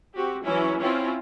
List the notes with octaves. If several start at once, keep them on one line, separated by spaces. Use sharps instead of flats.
C4 F#4 G4
E3 F#3 C#4 E4
C4 C#4 E4 F4